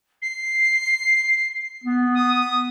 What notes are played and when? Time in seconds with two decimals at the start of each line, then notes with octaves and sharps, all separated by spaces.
0.22 C7
1.84 B3
2.14 D#6